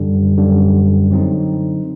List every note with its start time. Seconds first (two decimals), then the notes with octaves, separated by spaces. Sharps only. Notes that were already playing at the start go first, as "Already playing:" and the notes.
Already playing: F#2 D3 G3
0.38 F#2 D3 G3
1.11 D3 F#3 C4 D#4